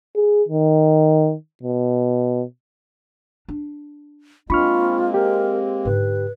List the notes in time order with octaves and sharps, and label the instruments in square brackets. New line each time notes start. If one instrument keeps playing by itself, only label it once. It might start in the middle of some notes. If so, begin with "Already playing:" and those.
[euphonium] G#4
D#3
B2
[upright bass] D4
[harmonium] G#3 A#3 C4 [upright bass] D4 [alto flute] F4 [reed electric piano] B5 C#6 F6
[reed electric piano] G4 [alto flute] A#4
[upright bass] G#2 D3 [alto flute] B4